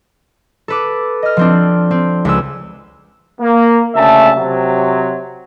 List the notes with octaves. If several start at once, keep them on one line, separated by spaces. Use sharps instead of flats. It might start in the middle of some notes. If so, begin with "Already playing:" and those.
A4 B4 D6
D#5 F6
F3 C4 D4
C4
C#2 B4 E6
A#3
D2 C#3 E5 A5
C3 F#3